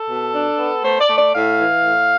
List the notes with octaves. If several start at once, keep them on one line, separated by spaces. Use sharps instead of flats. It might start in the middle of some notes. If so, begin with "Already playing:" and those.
Already playing: A4
B2
D4
B3
A3 C5
D5
A3
D5
A2 F5
E3
A2